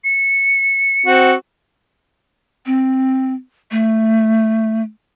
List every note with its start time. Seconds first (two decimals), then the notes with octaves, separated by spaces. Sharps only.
0.04 C#7
1.06 C4 F#4
2.66 C4
3.71 A3